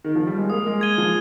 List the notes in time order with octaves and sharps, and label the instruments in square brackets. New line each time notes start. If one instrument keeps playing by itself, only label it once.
[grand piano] D#3
F3
G3
G#3
[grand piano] A#3 [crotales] D#6
[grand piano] G#3
[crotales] G#6 D#7 G7
[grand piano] F3